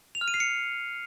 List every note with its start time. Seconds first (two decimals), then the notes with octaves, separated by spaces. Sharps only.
0.15 F7
0.21 F6
0.28 D#7
0.34 C7
0.40 C#7